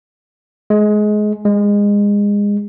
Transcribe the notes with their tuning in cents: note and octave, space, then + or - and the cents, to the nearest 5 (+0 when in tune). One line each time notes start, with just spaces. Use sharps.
G#3 +20
G#3 -25